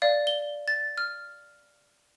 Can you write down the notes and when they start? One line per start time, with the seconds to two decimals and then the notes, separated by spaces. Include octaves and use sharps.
0.02 D5 F5
0.27 G7
0.68 A6
0.98 F6